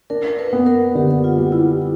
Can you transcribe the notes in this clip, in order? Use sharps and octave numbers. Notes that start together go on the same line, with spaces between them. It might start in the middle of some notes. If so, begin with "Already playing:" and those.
D4 A#4
A#4
B4
B3
A#4
D3 G4
F4
G3
E4